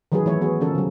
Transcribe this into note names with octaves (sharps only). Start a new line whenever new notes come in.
D#3 E3 F#3 F#4 G#4 B4
E3 A3 E4 C#5
B3 F#4 G#4
D3 F3 C#4 A4 A#4
C#3 F#3